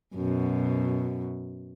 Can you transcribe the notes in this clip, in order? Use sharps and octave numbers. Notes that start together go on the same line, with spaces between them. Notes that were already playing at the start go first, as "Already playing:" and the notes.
F#2 B2